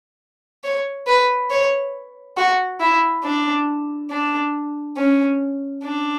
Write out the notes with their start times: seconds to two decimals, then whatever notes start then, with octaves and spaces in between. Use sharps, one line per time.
0.64 C#5
1.07 B4
1.50 C#5
2.37 F#4
2.80 E4
3.24 D4
4.11 D4
4.97 C#4
5.84 D4